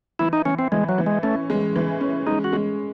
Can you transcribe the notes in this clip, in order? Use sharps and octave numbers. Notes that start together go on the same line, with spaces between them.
E3 E4
D#4
E3 C#4
C4
E3 G#3
F#3
E3
G#3
A3 C#4
G#3
E3
C#4
G#3 D#4
F#4
G#3